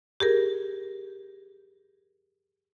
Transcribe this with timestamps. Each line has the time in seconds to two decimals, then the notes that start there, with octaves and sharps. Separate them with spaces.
0.20 G4 G#4 A#4